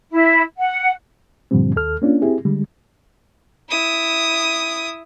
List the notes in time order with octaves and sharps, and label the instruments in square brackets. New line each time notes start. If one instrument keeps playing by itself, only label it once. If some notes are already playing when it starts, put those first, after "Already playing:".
[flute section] E4
F#5
[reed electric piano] G2 A#2 D3 F3 G3 C4
D#2 A4 F6
A#3 C#4 D4 F4
C4 E4 G4 G#4
D3 G3 G#3
[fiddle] E4 D#6